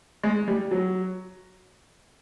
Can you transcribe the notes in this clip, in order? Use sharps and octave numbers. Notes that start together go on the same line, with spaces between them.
G#3
G3
F#3